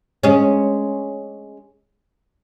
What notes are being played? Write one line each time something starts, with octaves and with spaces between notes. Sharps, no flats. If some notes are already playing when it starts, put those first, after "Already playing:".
G#3 C#4